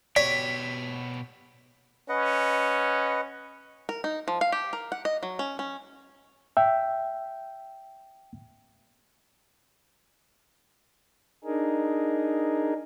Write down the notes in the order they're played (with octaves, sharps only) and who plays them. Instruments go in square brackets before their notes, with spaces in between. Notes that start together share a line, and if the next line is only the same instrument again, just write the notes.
[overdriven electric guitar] B2 G4 [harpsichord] C#5 [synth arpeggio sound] D5 [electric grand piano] B6
[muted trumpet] C#4 [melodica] B4 D#5 F#5
[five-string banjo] A#4
D#4
F3
F5
G4
A#4
F#5
D#5
F#3
C#4
C#4
[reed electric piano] E5 G5
[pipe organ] D4 D#4 G#4 A#4